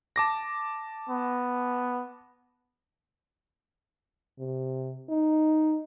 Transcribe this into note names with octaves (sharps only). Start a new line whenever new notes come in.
A5 D6 A#6
B3
C3
D#4